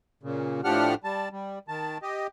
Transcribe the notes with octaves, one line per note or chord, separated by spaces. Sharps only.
A#2 C#3
A2 F3 D4 G4 F#5 F6
G3 A5
G3
D#3 A5
G4 D#5